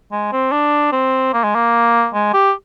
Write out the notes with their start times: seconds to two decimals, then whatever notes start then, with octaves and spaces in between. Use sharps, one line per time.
0.12 G#3
0.32 C4
0.52 D4
0.92 C4
1.33 A#3
1.44 G#3
1.55 A#3
2.14 G#3
2.34 G4